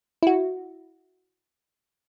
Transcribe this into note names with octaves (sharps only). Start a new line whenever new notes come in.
E4 F#4